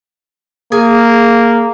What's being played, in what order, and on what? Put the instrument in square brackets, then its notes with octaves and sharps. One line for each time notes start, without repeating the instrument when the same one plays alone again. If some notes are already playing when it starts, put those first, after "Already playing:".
[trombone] A#3 [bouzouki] G#4 G#5